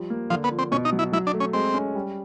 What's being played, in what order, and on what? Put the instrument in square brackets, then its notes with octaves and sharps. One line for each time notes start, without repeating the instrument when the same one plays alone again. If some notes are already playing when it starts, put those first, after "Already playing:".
Already playing: [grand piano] F3 G3
A#3
[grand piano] D3 [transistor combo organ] F3
[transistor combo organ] B3
[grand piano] F3
[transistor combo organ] C4
[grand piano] B2 [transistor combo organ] C#4
[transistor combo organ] D#4
[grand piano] F#3
[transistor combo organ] E4
[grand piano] F#3 [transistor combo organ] E4
[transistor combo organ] D4
[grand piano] A3
[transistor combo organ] C#4
[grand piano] G#3 [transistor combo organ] C4
[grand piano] C#4
G3